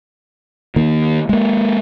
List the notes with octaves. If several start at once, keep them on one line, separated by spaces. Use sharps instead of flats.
D#3 A#3
G#3 A#3